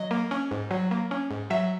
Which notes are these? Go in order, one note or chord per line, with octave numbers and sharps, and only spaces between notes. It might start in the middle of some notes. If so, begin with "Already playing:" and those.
Already playing: F#3 D#5
A#3
C#4
G#2
F#3
A#3
C#4
G#2
F#3 E5